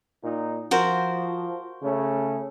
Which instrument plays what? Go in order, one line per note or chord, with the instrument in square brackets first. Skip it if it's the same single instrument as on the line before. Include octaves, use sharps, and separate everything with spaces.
[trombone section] A#2 D#4
[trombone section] F3 [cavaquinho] F#4 A#4 C5
[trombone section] C#3 A3 C#4